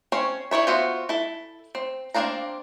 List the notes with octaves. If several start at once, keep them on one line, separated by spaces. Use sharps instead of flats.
C4 C#4 C#5
G3 E4 C#5 E5
B3 F4 F#4 C5 E5
E4 A4
C4
A#3 C4 D4 F5 A#5